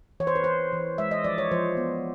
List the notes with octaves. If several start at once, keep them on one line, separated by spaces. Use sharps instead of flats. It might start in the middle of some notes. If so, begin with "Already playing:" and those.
E3 C#5
C5
B4
E3 C5
E3
G#3 E5
D#5
F3 D5
C#5
F3 C5
B3